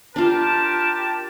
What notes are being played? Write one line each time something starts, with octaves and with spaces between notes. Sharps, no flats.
D4 F4 G4 A#4 A5